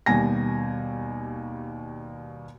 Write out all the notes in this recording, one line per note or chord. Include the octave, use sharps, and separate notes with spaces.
D#2 B2 G3 G#5 A#6